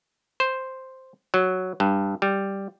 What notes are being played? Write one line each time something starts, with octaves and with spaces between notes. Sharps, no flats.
C5
F#3
G2
G3